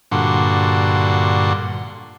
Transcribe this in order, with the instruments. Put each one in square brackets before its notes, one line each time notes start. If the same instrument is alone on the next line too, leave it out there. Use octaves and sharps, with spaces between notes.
[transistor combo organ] G2 A#2 D3 F#4 C6